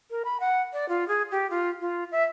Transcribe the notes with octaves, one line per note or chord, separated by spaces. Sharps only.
A#4
B5
F#5
D5
F4
G#4
G4
F4
F4
E5